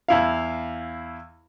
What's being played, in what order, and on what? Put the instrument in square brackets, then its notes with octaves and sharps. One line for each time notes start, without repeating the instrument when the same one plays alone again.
[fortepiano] E2 E4 F5